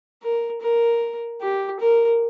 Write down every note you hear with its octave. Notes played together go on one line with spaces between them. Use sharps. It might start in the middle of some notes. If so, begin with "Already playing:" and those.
A#4
A#4
G4
A#4